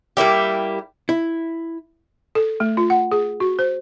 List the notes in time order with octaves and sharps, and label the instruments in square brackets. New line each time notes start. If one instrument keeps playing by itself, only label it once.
[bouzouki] G3 A#3 E4 G4
[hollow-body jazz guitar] E4
[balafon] A4
A3
F4
F#5
G#4
F#4
C5